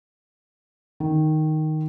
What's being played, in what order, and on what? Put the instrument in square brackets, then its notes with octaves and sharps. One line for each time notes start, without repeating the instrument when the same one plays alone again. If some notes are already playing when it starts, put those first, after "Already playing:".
[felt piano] D#3